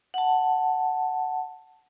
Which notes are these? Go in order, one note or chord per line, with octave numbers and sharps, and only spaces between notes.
F#5 A5